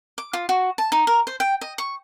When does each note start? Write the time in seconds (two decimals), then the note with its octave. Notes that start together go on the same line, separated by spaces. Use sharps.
0.18 D6
0.33 F4
0.49 F#4
0.78 A5
0.92 D#4
1.07 A#4
1.27 C5
1.40 G5
1.61 D#5
1.78 C#6